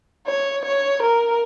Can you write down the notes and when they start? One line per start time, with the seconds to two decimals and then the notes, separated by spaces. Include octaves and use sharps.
0.27 C#5
0.65 C#5
1.02 A#4